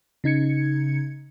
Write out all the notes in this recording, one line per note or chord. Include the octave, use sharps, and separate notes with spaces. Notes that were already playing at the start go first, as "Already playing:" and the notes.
C#3 D#4 G#6 C#7